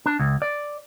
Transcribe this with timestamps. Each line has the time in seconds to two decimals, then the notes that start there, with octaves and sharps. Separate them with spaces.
0.06 D4
0.19 C#2
0.42 D5